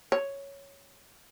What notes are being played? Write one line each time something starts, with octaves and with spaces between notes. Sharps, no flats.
C#5